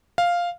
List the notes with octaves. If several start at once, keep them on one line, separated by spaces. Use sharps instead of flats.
F5